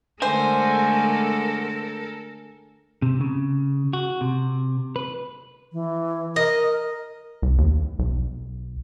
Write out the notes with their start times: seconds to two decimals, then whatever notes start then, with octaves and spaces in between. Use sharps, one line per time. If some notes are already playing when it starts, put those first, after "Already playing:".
0.22 D3 G#3 A3 A4 A#4 C5 G#5
3.02 C3
3.21 C#3
3.93 F#4
4.21 C3
4.96 B4
5.73 E3
6.36 A#4 D#5
7.42 C2
7.58 D#2
7.99 B1